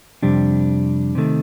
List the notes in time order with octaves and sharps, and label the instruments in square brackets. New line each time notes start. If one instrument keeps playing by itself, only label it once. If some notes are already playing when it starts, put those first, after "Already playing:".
[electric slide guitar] F2 C3 G3 D4 G4
C3 D#3 A3